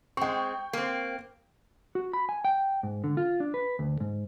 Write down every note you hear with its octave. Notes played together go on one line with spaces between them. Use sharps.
G#3 C4 G5 C#6
A#3 C4
F#4
B5
G#5
G5
G#2
D3
F4
D4
B4
D2
G#2